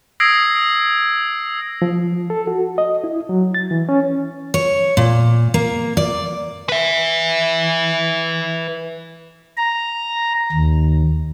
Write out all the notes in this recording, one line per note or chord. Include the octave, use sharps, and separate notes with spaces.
D#6 E6 G#6 A#6 C7 D7
F3
A4
F#4
D#5
E4
F#3
A6
E3
C#4
C#5
A#2
A#3
D5
B4 E5
A#5
D#2